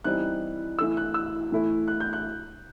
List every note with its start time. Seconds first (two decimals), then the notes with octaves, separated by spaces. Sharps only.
0.04 E3 G3 C4 D#4 F#6
0.78 E3 A3 E4 E6
0.97 F#6
1.14 E6
1.52 A2 E3 A3 E4
1.88 F#6
2.00 G6
2.13 F#6